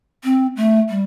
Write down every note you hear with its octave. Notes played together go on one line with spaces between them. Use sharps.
C4
A3
G3